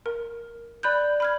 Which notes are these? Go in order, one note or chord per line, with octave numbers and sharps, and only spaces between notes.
A#4
D5 B5 F#6 G6
B5 F6 G#6